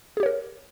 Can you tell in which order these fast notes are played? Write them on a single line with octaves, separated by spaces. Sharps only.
G#4 G4 C#5 A#4